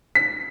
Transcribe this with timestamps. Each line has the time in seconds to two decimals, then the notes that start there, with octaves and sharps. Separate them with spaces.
0.15 B6